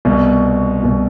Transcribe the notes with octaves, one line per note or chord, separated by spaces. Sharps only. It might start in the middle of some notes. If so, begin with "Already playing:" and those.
C2 B2
C2 B2